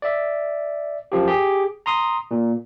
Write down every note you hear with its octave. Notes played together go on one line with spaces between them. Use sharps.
D5 E5
F#2 F3 G4
G4 G#4
A#5 C6 D#6
A#2